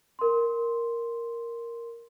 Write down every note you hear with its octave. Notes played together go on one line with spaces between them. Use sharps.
A#4 C6